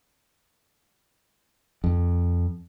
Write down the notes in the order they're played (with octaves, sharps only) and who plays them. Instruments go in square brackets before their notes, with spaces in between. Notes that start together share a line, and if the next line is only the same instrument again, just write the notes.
[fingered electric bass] F2